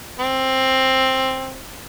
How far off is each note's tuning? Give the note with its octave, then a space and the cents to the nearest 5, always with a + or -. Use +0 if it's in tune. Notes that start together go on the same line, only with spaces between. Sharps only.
C4 +10